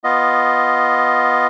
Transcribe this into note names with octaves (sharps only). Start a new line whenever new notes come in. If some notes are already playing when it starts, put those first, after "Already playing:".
B3 F4 D#5